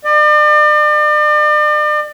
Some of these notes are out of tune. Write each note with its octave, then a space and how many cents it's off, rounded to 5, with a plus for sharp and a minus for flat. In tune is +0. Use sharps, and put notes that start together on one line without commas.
D5 +40